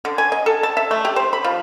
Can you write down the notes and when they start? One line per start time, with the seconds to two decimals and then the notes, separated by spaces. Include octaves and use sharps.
0.05 D3
0.18 G#5
0.32 D#5
0.46 A4
0.63 A5
0.77 E5
0.91 A3
1.05 G4
1.16 C5
1.33 B5
1.44 F3